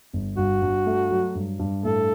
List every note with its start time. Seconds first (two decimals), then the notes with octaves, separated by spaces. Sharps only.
0.13 G1
0.37 G2 F#4
0.62 G2
0.86 A3
1.11 F#3
1.35 G2
1.59 G2
1.84 A2 A4